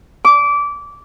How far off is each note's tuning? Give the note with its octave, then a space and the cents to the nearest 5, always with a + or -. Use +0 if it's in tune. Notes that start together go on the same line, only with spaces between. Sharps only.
D6 -20